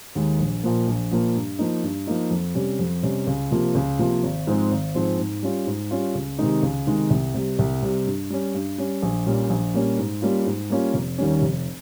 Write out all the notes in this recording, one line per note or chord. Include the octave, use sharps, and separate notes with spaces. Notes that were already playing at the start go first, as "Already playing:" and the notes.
D#2 D#3 G#3
A#1
A#2 F3 A#3
A#1
A#2 F3 A#3
G2
F3 A#3 D#4
G2
F3 A#3 D#4
F2
C3 G3 C#4
F2
C3 G3 C#4
C#2
C3 F3 A#3 F4
C#2
C3 F3 A#3 F4
G#1
G#2 F3 G#3 C4
G#1
G#2 F3 G#3 C4
G#2
G3 C#4 F4
G#2
G3 C#4 F4
C#2
C3 D#3 G#3 D#4
C#2
C3 D#3 G#3 D#4
C2
C3 G3
C2
C3 G3
G2
G3 C#4
G2
G3 C#4
A#1
A#2 G3 A#3 C#4
A#1
A#2 G3 A#3 C#4
G#2
G3 A#3 C#4 F4
G#2
G3 A#3 C#4 F4
F1
D#2 D#3 G3 C#4
F1